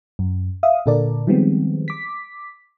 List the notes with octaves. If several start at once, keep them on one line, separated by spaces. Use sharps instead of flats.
F#2
E5 F5 D#6
A#2 D3 A4 A#4 D5
D#3 F3 G3 G#3 B3 C4
D6 B6